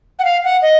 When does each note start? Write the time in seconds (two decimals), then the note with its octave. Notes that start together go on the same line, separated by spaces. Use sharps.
0.19 F#5
0.25 F5
0.44 F#5
0.62 D#5